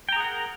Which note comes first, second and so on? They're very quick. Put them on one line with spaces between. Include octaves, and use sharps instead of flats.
G5 A#5 G#4 F#5 A#4